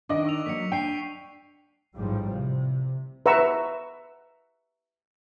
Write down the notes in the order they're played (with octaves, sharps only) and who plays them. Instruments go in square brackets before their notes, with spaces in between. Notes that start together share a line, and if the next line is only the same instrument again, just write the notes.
[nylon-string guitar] D#3 [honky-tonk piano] D4 D#5 [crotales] C#6 D7
[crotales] C#6 E6 F7
[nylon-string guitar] F#3 A#3 [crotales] B6 C#7
[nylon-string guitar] D4 [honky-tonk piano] G5 [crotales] C7 D#7
[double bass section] A1 G#2 F3 G3
C3
[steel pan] B4 E5 F#5 A#5 C#6 E6